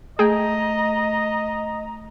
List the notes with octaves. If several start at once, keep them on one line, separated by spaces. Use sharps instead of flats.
A3 G#4 D#5 G5 A#5